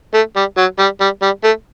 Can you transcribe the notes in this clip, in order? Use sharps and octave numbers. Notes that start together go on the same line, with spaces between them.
A3
G3
F#3
G3
G3
G3
A3